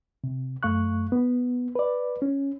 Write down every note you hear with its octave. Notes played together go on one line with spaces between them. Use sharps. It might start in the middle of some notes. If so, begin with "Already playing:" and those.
C3
F#2 A3 F5 C#6 F#6
B3
B4 D5
C#4